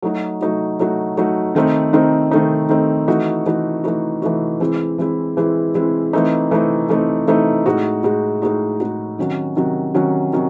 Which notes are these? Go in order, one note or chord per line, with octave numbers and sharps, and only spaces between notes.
F#3 A3 D#4 F#4
F#3 A3 D#4 F#4
F#3 A3 D#4 F#4
F#3 A3 D#4 F#4
D#3 A3 C4 D#4
D#3 A3 C4 D#4
D#3 A3 C4 D#4
D#3 A3 C4 D#4
E3 A3 D#4 F#4
E3 A3 D#4 F#4
E3 A3 D#4 F#4
E3 A3 D#4 F#4
E3 G#3 C4 E4
E3 G#3 C4 E4
E3 G#3 C4 E4
E3 G#3 C4 E4
E3 A3 C4 D#4
E3 A3 C4 D#4
E3 A3 C4 D#4
E3 A3 C4 D#4
A2 G#3 D#4 F#4
A2 G#3 D#4 F#4
A2 G#3 D#4 F#4
A2 G#3 D#4 F#4
C3 D#3 F#3 C#4 F#4
C3 D#3 F#3 C#4 F#4
C3 D#3 F#3 C#4 F#4
C3 D#3 F#3 C#4